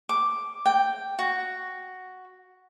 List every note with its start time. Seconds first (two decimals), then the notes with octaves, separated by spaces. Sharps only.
0.09 D6
0.66 G5
1.19 F#4